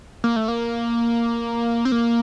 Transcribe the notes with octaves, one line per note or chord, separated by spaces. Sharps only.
A#3
A3
A#3
C4
A#3